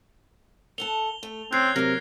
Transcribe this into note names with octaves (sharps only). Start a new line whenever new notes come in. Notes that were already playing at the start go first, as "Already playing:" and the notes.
A4 F#5 A5 F7 G7
A3
C#3 C4 F#6 G#6 C7
C3 F#3 A#3 A#4 A#6